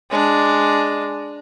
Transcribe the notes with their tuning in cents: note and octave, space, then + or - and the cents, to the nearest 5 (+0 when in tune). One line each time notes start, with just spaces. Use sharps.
G#3 +0 D4 +0